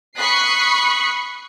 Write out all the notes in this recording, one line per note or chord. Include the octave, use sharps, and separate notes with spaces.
B5 C#6 D#6 F#6 B6 C7